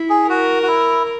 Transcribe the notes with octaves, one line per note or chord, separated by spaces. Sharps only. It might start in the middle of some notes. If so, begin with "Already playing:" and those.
Already playing: E4
G#4
F#4 A#4
F#4
E4